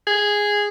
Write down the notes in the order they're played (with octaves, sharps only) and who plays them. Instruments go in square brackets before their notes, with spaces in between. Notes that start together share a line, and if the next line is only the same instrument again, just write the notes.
[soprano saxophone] G#4